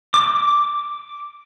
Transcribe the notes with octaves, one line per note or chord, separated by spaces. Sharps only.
D6